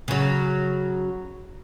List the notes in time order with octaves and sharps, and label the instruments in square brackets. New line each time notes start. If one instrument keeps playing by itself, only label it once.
[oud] C#3 F#3